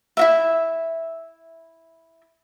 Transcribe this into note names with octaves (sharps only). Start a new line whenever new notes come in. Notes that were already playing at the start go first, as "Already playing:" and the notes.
E4 F#4 E5